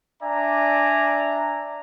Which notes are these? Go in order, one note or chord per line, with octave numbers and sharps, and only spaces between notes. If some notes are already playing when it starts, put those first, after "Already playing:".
D4 D5 E5 G#5 A#5